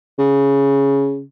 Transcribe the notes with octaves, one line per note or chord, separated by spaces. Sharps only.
C#3